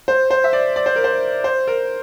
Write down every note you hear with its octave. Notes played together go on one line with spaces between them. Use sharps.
C5
C5
E5
D5
D5
C5
A#4
C5
C5
A#4